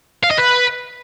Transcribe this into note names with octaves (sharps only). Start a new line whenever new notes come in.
F5
D#5
B4